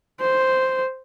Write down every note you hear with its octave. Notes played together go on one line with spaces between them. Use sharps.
C5